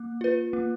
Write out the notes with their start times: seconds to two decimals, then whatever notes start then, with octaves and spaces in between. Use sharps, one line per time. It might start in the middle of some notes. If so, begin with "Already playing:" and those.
Already playing: A#3
0.21 F4 B4
0.53 A#3